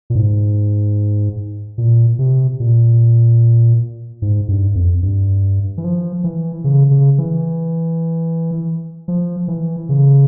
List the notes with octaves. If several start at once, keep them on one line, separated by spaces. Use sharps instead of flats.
A#2
G#2
A#2
C3
A#2
G#2
G2
F2
G2
E3
F3
E3
C#3
C#3
E3
F3
E3
C#3